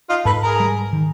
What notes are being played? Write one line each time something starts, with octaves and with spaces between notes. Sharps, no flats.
D#4 F4
G#2 A4 B4
G#4 A#4
G3
D#3